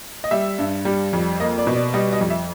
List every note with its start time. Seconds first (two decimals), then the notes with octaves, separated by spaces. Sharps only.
0.24 D#5
0.31 G3 E5
0.59 G2
0.85 G3
1.13 F2
1.40 A#3 D#5
1.58 D5
1.67 B2
1.76 D5
1.94 G3 D#5
2.12 D#5
2.21 F2
2.30 E5